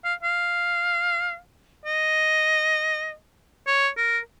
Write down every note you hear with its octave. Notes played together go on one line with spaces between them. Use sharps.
F5
F5
D#5
C#5
A#4